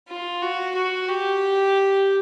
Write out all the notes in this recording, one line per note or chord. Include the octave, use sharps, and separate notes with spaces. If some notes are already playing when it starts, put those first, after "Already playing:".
F4
F#4
F#4
G4